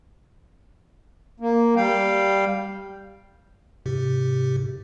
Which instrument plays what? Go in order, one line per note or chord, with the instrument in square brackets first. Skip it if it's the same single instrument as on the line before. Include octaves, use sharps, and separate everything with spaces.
[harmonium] A#3
G3 F5 G5
[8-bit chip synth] G#2 C3 G4